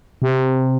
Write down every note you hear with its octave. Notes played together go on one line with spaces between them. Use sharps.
C3